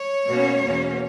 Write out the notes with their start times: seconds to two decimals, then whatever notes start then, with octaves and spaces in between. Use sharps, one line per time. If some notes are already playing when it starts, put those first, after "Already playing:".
Already playing: C#5
0.27 B2 A#3 C#4
0.63 E2 B2 A#3 C#4